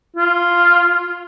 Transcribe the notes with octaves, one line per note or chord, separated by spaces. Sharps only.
F4